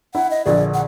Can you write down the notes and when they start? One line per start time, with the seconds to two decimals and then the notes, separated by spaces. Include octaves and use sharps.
0.15 E4 F#5
0.31 D#5
0.46 A#1 D3 G#4 D5
0.74 F#5